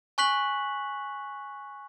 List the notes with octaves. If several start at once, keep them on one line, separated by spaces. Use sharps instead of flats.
G#5 C#6 F#6 B6 F#7